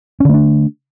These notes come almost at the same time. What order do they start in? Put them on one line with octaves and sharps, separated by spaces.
C#4 D3 A3 D4